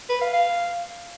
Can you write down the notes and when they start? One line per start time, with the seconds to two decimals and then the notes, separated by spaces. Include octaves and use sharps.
0.09 B4
0.21 F5
0.33 F5